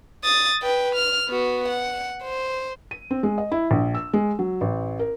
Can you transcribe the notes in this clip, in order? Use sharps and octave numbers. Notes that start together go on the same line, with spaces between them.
D#6 A6
B4 G5
F6
B3 F#4
F#5
C5
D#7
C4
G#3
D#5
E4
A#1
E6
G#3
F#3
A1
A#4